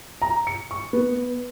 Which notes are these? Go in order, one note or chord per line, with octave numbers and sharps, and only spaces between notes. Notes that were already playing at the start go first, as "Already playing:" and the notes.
A#5
C#7
C#6
B3